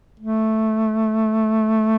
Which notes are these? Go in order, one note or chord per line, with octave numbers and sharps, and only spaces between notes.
A3